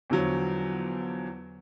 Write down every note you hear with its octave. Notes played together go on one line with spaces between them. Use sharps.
E2 D3 F3 F#3